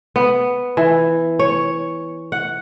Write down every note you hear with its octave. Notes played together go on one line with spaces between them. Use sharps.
B3
E3
C#5
F#5